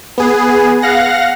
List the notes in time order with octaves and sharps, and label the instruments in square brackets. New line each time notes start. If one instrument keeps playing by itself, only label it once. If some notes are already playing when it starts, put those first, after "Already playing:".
[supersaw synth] B3 G#4
F5 F#5 A#6